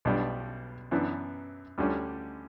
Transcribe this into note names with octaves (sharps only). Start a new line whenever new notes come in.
B1 B2 G3 D4
F#2 E3 B3 D4
D2 D3 G3 C#4